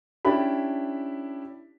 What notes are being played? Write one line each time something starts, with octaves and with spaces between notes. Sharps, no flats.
C#4 D4 E4 G4 B5